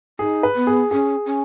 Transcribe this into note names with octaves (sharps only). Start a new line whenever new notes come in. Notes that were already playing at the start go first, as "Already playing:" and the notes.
D#4 G#4
B4
B3
G#4
C#4 G#4
C#4